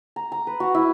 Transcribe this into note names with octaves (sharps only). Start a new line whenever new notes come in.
A#5
A#5
B4
F#4
E4